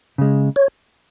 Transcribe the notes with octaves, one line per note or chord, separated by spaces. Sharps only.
C#3 G#3
C#5